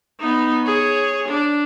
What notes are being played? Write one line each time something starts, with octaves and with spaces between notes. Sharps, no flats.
B3 D#4
G#4 C#5
D4